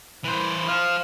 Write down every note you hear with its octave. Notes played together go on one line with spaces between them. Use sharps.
E3 C5
C5 F5